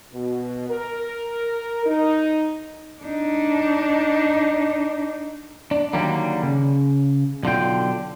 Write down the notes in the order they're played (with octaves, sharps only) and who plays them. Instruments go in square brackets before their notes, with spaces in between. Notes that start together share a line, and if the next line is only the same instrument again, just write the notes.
[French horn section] B2
A#4
D#4
[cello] D4 D#4
[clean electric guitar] D4
D3 D#3 F#3 G3 A#3
C#3
B1 D3 F4 G5